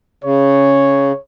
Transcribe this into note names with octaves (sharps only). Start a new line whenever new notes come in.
C#3 C#5